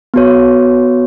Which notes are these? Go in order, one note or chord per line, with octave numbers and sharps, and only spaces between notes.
B3 F#4 C#5